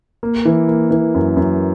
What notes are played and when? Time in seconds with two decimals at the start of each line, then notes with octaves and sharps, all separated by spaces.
0.23 A#3
0.45 E3
0.68 A#3
0.91 E3
1.15 F#2
1.37 F#2